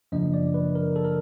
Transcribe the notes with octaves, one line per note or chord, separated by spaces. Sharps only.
F#2 C#3 F3 A#3 D4 D#5
D5
B4
A#4
A4
A#4